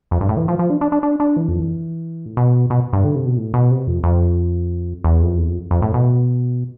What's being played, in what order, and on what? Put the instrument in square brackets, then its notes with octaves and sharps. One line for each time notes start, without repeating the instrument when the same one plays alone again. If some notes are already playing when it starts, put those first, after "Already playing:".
[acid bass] F2
G2
A2
E3
F3
F3
D4
D4
D4
D4
D4
E3
F2
E3
A2
B2
B2
G2
D3
C3
B2
A2
B2
C3
F2
F2
E2
F2
E2
F2
F2
A2
B2